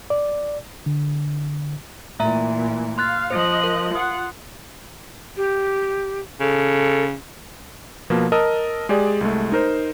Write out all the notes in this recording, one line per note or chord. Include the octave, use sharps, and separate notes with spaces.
D5
D3
A#2 E3 A3 E5 A#5
F5 C6 F#6 A6
F3 C5 D#5 F#6
A#4
F4 F#5 D#6
G4
C#3 A4
B2 F3 A#3
A#4 D#5 A5 D#6 E6
G#3 G4 G#4 D5
C2 G#3 A3
D#4 A#4 C5